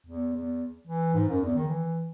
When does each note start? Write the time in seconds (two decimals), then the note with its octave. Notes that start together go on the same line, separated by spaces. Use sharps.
0.06 E2
0.33 E2
0.87 E3
1.14 G#2
1.28 F#2
1.40 E2
1.54 D#3
1.68 E3